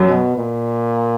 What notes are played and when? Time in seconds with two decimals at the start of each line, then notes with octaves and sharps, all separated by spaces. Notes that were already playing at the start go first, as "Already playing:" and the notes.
Already playing: F#2 F#3
0.08 B2
0.37 A#2